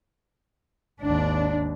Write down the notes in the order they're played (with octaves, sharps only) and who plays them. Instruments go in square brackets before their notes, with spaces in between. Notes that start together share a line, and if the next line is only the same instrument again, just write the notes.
[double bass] G#1 D#2 [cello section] D4